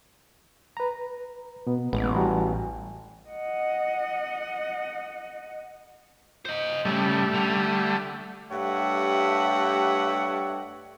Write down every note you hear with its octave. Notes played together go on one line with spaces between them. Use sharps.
B4 A#5
B2 B3
A1 G#3 B3
E3 G3 F#4
D#5 F#5
C5 D#5
G2 C#3 G3 A3
D3
G2 A3 G4 C#5 E5 F#5